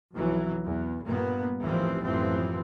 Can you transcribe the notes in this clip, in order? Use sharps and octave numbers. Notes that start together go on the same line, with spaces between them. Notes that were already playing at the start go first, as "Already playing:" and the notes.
B1 F2 E3 F#3
E2
G2 A#2 A#3 B3
A1 D#2 E3 F3 G3 C4
A1 F#2 E3 F3 C4